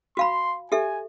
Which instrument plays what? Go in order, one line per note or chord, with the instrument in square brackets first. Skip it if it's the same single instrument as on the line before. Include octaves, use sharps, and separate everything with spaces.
[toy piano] F#4 F5 B5 [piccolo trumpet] C6
[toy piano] G4 A4 E5 [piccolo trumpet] G#5